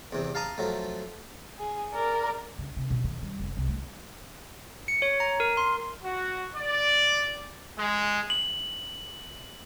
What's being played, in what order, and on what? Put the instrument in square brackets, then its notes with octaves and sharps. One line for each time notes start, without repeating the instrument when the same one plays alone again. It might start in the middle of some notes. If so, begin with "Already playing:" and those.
[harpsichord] E2 C3
F5 A5 A#5 D#6
F3 F#3 A3
[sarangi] G#4
[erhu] A#4 [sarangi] D5
[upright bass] C#3
C3
B2
D#3
G3
F1
C2
A3
[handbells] C#7
C#5
A#5
A#4
C6
[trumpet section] F#4
D5
G#3
[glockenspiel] F#7